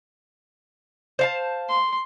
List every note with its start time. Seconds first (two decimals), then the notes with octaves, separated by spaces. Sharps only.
1.19 C5 F5 A5
1.69 C6